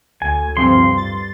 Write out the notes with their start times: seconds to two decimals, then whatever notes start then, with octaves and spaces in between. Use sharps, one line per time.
0.22 D2 G#5
0.57 G2 C3 F3 C4 C6
0.97 A6